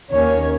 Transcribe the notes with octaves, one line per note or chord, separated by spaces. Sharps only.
D#2 D#3 A#3 C#4 C#5